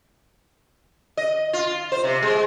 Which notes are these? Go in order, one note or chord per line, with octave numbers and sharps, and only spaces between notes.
D#5
F4
C5
C3
G#3